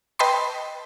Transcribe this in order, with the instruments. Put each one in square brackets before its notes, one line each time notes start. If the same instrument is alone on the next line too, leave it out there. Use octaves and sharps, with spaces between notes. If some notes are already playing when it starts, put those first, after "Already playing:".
[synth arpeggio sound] B4 D#5 G5 A5 B5 C6